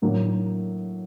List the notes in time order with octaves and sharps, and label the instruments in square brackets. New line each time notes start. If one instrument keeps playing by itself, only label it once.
[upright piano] A2 F#3 A#3 D4